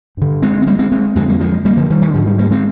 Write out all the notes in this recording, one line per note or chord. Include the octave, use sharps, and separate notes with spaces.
G2 D3
G#3 C4
C4
G3 A#3
G#3 C4
G#3 C4
F2 D3 G#3 C4
G3 A#3
F3 G#3
G3 A#3
D3 F3
D#3 G3
D#3
G#2 D3 F3
D#3 G3
G3 A#3
G#3 C4